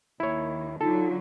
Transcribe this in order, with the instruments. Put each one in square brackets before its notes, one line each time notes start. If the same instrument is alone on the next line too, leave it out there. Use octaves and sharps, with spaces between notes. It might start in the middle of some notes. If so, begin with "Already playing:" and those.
[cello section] D#2 D#3 [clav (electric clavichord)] E4 C#5
[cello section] D3 F#3 [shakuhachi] D#4 [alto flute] F4 [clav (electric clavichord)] A4